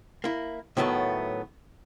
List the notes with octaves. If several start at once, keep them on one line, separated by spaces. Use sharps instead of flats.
A#3 E4
A2 D#3 F#3 A3 B3